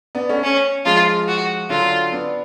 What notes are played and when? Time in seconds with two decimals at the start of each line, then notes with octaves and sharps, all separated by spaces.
0.15 B3 D4
0.29 A3 C#4
0.44 C#4
0.85 F3 G#3 F4
1.28 F#4
1.70 D3 F#3 F4
2.12 B3 D4